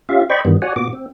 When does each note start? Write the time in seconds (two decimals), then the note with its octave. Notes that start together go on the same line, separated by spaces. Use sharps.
0.09 C#4 F4 G4 E5 F5
0.30 C5 D5 D#5 G5 B5 C#6
0.45 G2 D#3 E3 G3 B3
0.62 F#4 C#5 D5 F#5 G#5
0.76 A#2 B3 F#4 D6
0.93 C4